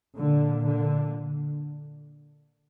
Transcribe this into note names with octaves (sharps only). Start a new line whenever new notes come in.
A#2 D3
D3